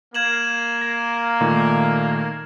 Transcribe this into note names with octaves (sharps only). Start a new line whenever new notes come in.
A#3 G#6 E7 F#7
A#6
A#2 D#3 A3